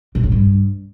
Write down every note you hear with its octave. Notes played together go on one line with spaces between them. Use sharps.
C3
A2
G2